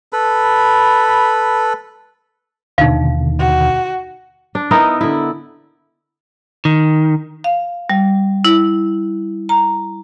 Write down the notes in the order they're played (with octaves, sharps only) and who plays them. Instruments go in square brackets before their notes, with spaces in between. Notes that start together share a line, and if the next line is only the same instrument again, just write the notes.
[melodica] A4 B4 B5
[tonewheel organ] D#2 [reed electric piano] B2 D3 [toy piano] D#4 F5
[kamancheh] F#4
[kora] D4
B3 D#4 E4 A#4
D3 E4
[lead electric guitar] D#3
[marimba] F5
G3
E4
A#5